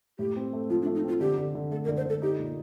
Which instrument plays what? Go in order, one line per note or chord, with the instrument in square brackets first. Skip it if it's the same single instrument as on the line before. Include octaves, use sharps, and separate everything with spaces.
[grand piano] A2 [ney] G4
[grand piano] C4
A3
[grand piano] F3 [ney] F4
[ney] D4
[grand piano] A3
[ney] D#4
[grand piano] C4 [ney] F4
[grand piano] D3 [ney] G4
[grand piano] D3
D3
[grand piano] A3 [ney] A4
[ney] A#4
[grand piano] D3
[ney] C5
[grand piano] D3 [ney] A4
[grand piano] D#4 [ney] G4
[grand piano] A#2